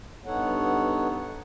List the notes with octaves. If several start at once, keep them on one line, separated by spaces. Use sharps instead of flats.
G2 B3 D#4 A4 C#5 F#5